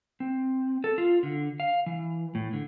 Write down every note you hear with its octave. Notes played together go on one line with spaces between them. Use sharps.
C4
A4
F4
D3
F5
E3
A2
D3